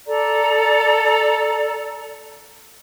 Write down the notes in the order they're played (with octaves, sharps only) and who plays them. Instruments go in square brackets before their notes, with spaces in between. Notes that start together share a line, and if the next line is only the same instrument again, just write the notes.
[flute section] A4 D5 A#5